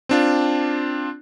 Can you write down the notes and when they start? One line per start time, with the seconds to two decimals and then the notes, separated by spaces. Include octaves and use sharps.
0.09 C4 D4 F4